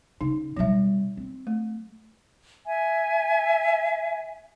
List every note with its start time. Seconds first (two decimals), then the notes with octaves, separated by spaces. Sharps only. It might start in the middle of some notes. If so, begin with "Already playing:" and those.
0.21 C#3 D#4
0.57 B2 F#3 G3 E5
1.17 C4
1.47 A3
2.66 E5 G#5